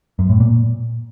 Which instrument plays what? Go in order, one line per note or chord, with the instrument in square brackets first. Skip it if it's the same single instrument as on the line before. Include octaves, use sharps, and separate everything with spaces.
[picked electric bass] F#2
A2
A#2